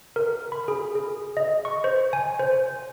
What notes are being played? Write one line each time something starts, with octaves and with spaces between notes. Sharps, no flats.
A#4
B5
G#4
G#4
D#5
C#6
C5
G#5
C5